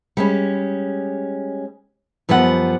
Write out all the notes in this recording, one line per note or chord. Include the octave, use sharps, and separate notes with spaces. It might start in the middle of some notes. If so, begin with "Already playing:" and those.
G3 G#3 C#4
F#2 F3 G3 B3 F#4 F#5